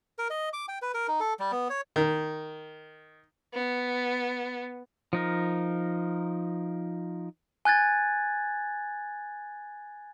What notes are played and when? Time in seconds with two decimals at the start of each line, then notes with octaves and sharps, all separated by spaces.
0.19 A#4
0.30 D#5
0.53 D6
0.68 G5
0.82 B4
0.94 A#4
1.08 D#4
1.20 A4
1.39 G3
1.52 B3
1.70 C#5
1.96 D#3
3.54 B3
5.13 F3 D#4 A#4
7.65 G#5 F#6 G#6 A6